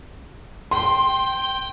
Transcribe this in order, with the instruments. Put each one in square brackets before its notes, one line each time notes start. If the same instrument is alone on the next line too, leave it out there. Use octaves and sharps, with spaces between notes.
[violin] G5 [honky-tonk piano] C6